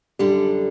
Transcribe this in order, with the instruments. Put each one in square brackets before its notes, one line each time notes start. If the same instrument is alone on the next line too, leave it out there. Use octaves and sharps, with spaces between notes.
[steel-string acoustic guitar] F#2 D3 G3 D4 A4 [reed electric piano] G4